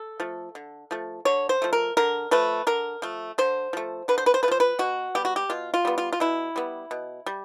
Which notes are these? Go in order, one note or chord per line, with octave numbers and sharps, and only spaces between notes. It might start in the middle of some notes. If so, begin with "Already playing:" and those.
Already playing: A4
F3 A3
D3
F3 A3
D3 C#5
C5
F3 A3
A#4
D3 A#4
F3 A3 B4
D3 A#4
F3 A3
D3 C5
F3 A3
D3 B4
C5
B4
C5
A3 B4
F3 C5
B4
B2 F#4
G3 B3 G4
F#4
G4
B2 F4
F4
G3 B3
F4
F4
B2 E4
G3 B3
B2
G3